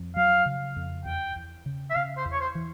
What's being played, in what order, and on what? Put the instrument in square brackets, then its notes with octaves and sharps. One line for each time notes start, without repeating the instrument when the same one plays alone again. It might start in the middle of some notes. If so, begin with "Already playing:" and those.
Already playing: [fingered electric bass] F2
[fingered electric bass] F#3 [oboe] F5
[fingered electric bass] C#3
F2
[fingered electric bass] E2 [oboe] G5
[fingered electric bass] E2
C#3
[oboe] E5
[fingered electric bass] C#3 [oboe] F5
[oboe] C5
[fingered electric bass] E2
[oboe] C#5
C5
[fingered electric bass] E3